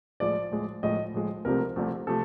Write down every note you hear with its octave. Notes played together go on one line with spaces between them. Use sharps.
A2 F3 G#3 D5
A2 F3 G#3
A2 F3 G#3 D#5
A2 F3 G#3
C2 C3 F3 A3 C4 A#4
C2 C3 F3 A3 C4
C3 F3 A3 A4